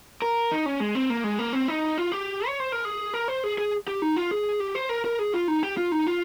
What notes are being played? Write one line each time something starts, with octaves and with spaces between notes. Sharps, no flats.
A#4
D#4
C#4
G#3
C4
A#3
G#3
A#3
C4
D#4
F4
G4
C#5
C5
A#4
G#4
A#4
C5
G#4
G#4
G4
D#4
F4
G#4
G4
C5
A#4
A#4
G#4
F4
D#4
G4
F4
D#4
F4